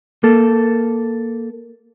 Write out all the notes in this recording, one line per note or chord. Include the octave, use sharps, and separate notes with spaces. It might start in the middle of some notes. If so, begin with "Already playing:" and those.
A#3 A4